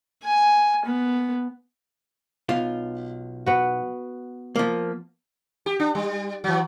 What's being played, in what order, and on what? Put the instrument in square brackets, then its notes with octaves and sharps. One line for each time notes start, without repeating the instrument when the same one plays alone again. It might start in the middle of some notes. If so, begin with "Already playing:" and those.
[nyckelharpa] G#5
B3
[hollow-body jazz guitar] B1 F4 F5
[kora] B3 F#4
[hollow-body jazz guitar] F3 A#3
[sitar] G4
D4
G3
E3 F#3